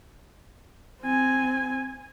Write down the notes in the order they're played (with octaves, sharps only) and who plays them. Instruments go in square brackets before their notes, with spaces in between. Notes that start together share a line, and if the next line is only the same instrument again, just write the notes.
[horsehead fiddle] C4 G#5